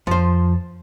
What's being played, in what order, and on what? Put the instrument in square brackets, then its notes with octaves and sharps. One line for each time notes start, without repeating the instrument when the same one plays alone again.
[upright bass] F2 [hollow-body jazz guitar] F3 C5